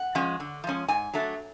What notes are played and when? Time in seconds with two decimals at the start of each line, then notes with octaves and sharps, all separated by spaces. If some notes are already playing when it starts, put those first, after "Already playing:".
Already playing: F#5
0.15 F3 G#3 C#4
0.40 D3
0.64 F3 G#3 C#4
0.88 G#2 G#5
1.13 F#3 A3 D4